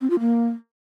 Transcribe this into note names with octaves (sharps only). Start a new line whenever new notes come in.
C4
F4
A#3